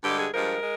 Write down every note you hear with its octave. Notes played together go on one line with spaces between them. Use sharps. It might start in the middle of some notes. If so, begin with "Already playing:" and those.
G2 D3 G#3 G4
G#4
G2 F3 G#3 A#4
G#3